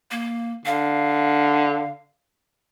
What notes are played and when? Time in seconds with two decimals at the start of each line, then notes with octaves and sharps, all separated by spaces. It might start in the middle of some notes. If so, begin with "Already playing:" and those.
0.11 A#3
0.66 D3 F5